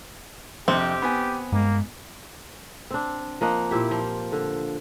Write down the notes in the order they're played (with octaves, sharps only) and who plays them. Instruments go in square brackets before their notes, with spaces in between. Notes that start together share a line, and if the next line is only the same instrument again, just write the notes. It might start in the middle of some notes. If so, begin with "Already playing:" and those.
[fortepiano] A#1 F2 C3 [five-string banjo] C4 [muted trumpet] G4
[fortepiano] B3 G#5
[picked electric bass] G2 G#3 [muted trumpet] A#3
[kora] C4 D4
F3 A#3 D#5 F#5
A#2 E4 G4
F3
D3